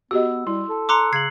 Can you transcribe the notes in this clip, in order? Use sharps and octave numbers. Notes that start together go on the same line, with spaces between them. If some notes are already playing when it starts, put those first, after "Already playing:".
B3 F#4 G4 D#5 E6
G3 E4 C6
A4
A#5 C6 D6 E6 F#6 C#7
C#3 G#6 C7 F#7